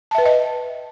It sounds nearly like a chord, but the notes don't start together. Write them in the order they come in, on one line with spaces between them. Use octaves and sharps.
A5 E5 B4 G5 D#5